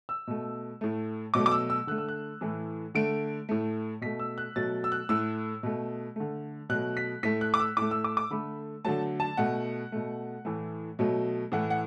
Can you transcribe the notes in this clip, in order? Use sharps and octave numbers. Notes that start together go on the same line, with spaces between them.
E6
B2 A3
A2 A3
B2 F#3 A3 D6
D6
E6
E6
D3 A3 F#6
E6
F#6
A2 E3 A3
D3 A3 D7
A2 A3
B2 A3 B6
E6
F#6
B2 F#3 A3 A6
E6
F#6
A2 A3 E6
B2 A3
D3 A3
B2 F#3 A3 F#6
B6
A2 A3 B6
F#6
D6
E6
A2 A3 D6
E6
D6
D6
D3 A3 B5
D3 F#3 A3 A5
A5
B2 A3 F#5
B2 A3
A2 E3 A3
B2 F#3 A3
A2 E3 A3 F#5
F#5